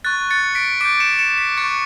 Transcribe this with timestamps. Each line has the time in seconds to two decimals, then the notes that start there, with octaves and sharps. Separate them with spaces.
0.05 C#6 F#6 A6
0.31 A6 C#7
0.55 B6 D7
0.81 D6 G6 B6 D7
0.99 C#7 E7
1.19 C#7 E7
1.38 B6 D7
1.57 C#6 F#6 A6 C#7